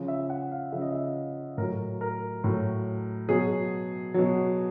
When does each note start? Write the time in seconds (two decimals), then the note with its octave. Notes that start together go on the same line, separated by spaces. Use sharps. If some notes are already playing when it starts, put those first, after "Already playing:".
Already playing: C#3 F3
0.08 E5
0.30 F#5
0.52 F5
0.72 C#3 F3 E5
0.82 D#5
0.91 E5
1.57 A2 A#4
1.61 F#3
2.01 A#4
2.44 A2 F#3
3.29 B2 F#3 G#4
4.14 B2 F#3